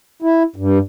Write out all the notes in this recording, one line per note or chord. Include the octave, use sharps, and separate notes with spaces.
E4
G2